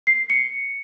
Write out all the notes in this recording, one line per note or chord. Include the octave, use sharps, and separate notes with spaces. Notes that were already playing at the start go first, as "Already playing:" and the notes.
C7
C#7